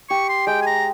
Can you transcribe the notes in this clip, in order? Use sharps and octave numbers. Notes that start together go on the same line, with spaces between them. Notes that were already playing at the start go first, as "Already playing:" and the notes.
G4 C#6
C6
G#3 G5
G#5
A#5